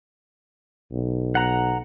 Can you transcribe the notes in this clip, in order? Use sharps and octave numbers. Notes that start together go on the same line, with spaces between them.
B1
F#5 A#5